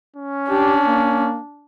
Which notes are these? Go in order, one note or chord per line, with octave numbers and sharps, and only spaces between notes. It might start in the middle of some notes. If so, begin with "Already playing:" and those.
C#4
D4 G4
A#3